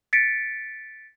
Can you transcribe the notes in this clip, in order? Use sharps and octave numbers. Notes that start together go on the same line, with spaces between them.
A6 B6 C#7 D7